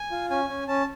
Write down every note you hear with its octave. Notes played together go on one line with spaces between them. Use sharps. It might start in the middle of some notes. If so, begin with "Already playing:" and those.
Already playing: G#5
F4
C#4 G#5
C#4
C#4 A5